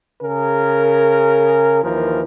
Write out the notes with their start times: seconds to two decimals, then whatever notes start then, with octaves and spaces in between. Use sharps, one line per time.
0.23 C#3 G#4 A#4
1.83 D#2 E3 F3 A#4